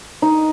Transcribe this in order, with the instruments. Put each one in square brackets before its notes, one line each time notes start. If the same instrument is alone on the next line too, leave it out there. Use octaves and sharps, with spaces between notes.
[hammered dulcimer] D#4